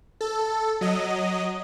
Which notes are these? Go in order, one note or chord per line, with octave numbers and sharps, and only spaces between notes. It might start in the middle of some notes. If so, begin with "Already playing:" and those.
A4
F#3 D#5